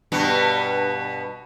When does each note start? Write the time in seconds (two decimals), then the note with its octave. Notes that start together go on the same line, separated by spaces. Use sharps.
0.12 G2 B2 B3